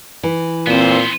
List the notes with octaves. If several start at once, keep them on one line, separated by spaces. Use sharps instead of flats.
E3
A#2 B3 C4 C5